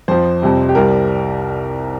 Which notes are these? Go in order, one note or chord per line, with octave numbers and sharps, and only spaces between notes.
F2 F3 C5
F2 C3 G3
G4
C2 C3 G3 A#4